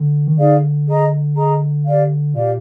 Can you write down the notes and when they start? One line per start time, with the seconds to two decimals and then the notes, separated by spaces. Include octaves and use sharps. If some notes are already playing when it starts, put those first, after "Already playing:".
Already playing: D3
0.27 D#3
0.38 D3 D#4 G#4 D5 F5
0.87 G#4 D#5 A#5
1.36 G#4 D#5 A#5
1.85 G4 D5 F5
2.34 A#2 G4 D5 F5